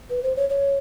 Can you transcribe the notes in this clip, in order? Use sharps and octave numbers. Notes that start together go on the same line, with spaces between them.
B4
C5
C#5
C#5